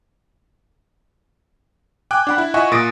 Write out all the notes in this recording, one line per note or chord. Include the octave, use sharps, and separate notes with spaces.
G5 G#5 D6 F#6
D4 F#5 B5
E4
F4 D#5 E5 F#5 G#5 C#6
A#2 D#6 A6 A#6 D7